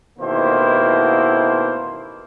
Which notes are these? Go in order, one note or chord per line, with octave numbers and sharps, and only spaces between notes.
A1 B2 D#3 A#3 E4 C5